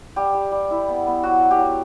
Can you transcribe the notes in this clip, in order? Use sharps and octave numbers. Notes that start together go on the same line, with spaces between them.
G3 G4
G3
G3
E4
B3
B3
F#3 F#4
F#3
G4
F#3